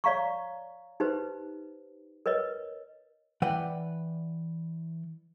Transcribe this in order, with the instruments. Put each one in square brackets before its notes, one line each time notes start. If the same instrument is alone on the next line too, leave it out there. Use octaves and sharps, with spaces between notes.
[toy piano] C#5 D5 F5 A#5 C#6
D#4 G4 B4 C5
A#4 B4 C#5 D#5
[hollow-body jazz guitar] E3 B4 D5 F#5 G5